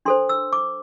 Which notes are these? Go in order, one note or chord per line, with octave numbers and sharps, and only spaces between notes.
D4 A4 C5 C6
E6
D6